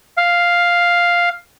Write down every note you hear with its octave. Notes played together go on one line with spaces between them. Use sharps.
F5